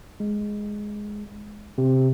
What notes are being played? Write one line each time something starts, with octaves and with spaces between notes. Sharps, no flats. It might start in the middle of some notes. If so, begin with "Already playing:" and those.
G#3
C3